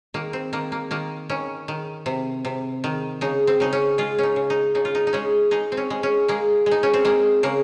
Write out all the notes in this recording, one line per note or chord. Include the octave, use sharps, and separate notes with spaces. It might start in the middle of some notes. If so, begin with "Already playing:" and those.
D#3 A#3
C4
D#3 A#3
A#3
D#3 A#3
D#3 C#4
D#3
C3
C3
D#3
C#3 D#4
C4
C#3 D#4
C#4
G#3 F4
C#4 D#4
C#3
D#4
C#3 D#4
F4
D#4
D#4
G#3 C#4
G#3 D#4
C4
C#4
G#3
C#4
G#3 A#3
G#3
D#4
C#4
C4
G#3 A#3
C#3 A#3